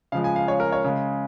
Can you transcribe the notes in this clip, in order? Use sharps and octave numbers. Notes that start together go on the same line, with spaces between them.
C#3 F3 G#3 F5
G#5
F5
C#5
A#4
C#5
C#3 G#3